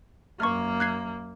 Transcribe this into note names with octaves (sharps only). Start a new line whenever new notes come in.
F#2 A#3 C#6 F6
F#6 G#6 C7